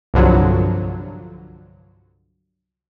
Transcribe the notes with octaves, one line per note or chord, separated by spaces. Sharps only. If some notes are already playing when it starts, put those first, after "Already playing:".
C2 G2 D3 F3 F#3